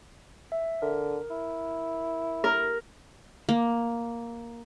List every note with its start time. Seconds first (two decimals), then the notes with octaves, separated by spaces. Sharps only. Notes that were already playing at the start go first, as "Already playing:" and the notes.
0.52 E5
0.82 D3 A#4
1.30 E4
2.44 A#4
3.49 A#3